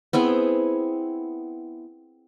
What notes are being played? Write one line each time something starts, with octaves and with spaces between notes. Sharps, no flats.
B3 C4 E4 G#4